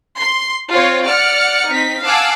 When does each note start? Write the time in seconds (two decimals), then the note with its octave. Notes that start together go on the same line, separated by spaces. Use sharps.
0.18 C6
0.72 C4 F4 C5 C#5
1.06 D5 F#5 F6 C#7
1.71 C4 D#4 B6
2.03 F5 F#5 G#5 A5 D6 E6